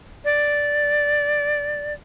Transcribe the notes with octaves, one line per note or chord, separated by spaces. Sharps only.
D5